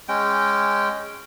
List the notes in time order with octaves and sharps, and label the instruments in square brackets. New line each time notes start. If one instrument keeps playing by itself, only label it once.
[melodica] G#3 C#4 G5